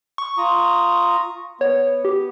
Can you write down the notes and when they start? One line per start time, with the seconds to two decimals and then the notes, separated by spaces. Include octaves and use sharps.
0.18 C#6
0.38 F4 A#5 D#6
1.61 B3 C#5
2.05 G4